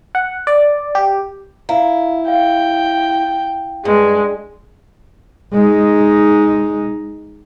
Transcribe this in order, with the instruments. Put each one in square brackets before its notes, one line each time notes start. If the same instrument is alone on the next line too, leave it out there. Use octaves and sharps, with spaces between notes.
[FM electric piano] F#5
D5
G4
[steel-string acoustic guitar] E4 [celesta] E5 F5 A#5
[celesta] F5 [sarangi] G5
[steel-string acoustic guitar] G2 [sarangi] G#3
[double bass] G#3 D#4